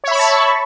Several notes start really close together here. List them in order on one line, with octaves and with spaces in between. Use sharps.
C#5 E5 B5 C#6 A5